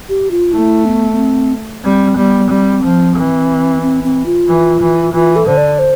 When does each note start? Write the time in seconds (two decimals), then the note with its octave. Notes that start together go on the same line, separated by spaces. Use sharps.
0.09 G4
0.31 F4
0.53 A3 E4
0.86 B3
1.13 B3
1.19 C4
1.84 G3 C4
2.17 G3 B3
2.50 G3 C4
2.83 F3
3.16 E3
3.82 C4
4.04 C4
4.26 F4
4.48 E3
4.81 E3
5.13 E3 F4
5.36 A4
5.47 D3 C5
5.58 D5
5.79 C5